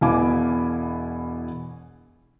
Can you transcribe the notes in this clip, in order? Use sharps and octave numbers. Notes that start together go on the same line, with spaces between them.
E1 B2 E4 F5 G#5 D6